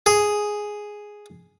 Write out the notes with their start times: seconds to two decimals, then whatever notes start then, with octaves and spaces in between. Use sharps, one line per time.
0.06 G#4